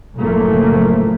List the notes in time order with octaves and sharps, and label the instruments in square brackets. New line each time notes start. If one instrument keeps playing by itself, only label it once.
[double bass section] F#1 A2 F3 A3 A#3